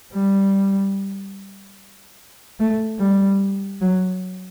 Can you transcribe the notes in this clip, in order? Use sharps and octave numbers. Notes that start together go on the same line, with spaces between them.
G3
A3
G3
F#3